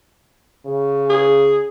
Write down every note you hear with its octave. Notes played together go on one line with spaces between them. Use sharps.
C#3
G#4